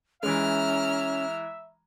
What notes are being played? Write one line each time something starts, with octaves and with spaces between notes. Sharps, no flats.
E3 G#3 C#4 E5 A#5 F6